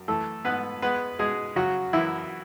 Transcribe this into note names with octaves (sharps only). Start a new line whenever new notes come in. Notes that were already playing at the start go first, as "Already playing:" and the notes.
Already playing: F#2
E3 A3 A4
G#2 B3 B4
G#3 B3 B4
B2 G#3 G#4
C#3 F#3 F#4
F#2 E3 E4